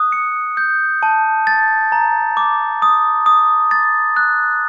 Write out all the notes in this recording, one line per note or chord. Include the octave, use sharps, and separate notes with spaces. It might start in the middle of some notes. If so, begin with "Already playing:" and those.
Already playing: D#6 F#6
C#7
G6
A5
A6
A#5
D6
D#6
D#6
A6
F#6